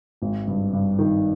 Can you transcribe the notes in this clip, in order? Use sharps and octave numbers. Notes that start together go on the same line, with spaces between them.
G#1
G2
G2
D#3